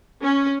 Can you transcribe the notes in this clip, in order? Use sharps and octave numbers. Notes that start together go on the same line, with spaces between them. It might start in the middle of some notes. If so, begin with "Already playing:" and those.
C#4